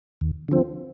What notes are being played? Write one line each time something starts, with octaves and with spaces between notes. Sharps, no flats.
D#2
D3 F3 C4